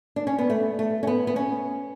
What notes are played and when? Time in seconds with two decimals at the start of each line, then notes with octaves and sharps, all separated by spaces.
0.16 D4
0.27 C#4
0.38 B3
0.50 A3
0.79 A3
1.03 C#4
1.07 B3
1.27 B3
1.36 C#4